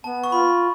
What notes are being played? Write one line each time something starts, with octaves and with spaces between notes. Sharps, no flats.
B3 A5
C#6
F4 B5